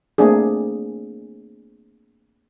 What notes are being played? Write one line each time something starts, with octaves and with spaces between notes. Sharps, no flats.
A3 A#3 C4 D4 G#4